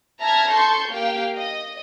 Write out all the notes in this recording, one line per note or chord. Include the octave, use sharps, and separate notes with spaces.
E5 A5 A#5 F6 G#6 A#6
A4 A5 C6 C#6 G6
A#3 G4 F5 G5
D#5